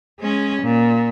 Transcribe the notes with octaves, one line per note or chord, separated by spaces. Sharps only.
G#3 C#4
A#2